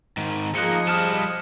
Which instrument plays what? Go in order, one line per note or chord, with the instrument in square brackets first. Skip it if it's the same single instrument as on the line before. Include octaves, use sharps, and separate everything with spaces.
[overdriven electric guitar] G#2 D#3
[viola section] F3 G#4 D#5 [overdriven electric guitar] A#3 D#4 [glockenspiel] F#6 C#7
[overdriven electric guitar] G3 A5 [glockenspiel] D#6 F6 E7